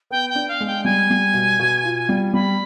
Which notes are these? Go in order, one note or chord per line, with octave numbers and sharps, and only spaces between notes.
B3 G5
G5
D4
F5
G#3
G5
G3 G#5
G3
B2
B2
F4
G3
G3 B5